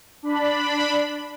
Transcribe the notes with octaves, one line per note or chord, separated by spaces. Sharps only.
D4 B5